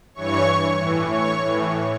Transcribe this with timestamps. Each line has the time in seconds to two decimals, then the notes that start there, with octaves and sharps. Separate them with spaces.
0.14 G2 E3 C#5 C#6
0.79 A2 E3
1.11 C#5 C#6
1.43 A2 E3